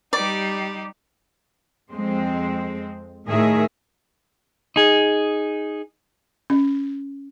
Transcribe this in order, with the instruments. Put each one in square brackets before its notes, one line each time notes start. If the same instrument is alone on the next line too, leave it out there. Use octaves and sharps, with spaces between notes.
[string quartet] G3 D#4 G4 [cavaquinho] D5
[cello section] F2 G#3 C4
A2 D#3 G#4 A#4 E5
[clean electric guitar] D#4 G#4
[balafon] C#4